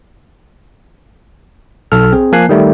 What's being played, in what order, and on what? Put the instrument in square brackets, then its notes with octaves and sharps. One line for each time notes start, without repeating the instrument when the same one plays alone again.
[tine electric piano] B1 A4 F6
C4 G#4
F3 A#3 G#5 A5 F#6 C7
D#3 G3 A3